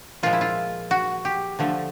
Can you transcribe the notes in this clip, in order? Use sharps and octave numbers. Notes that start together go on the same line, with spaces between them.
A#2 F3 G#3 F4
E4
F4
F#4
G4
D3 F3 A3